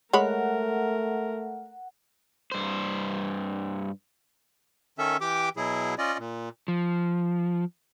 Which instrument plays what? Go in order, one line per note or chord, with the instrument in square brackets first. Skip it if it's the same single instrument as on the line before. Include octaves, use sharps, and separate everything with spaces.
[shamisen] G#3 C#5 B5 [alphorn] A3 [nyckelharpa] A#4 [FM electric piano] F#5
[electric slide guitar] G2 C5
[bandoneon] D#3 C#4 A4 E5
E3 G4 G5 D6
B2 F#3 E4 G#4
C#4 F4 D5 D#5
A#2
[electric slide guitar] F3